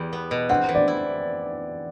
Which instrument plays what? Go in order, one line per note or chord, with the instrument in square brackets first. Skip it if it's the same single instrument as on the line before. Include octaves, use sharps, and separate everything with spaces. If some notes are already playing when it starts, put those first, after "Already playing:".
Already playing: [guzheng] E2 G3
B3
B2
[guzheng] C4 [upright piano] F#5
[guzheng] E3
[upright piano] D5
[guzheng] E4